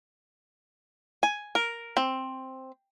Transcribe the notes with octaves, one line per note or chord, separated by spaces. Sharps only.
G#5
A#4
C4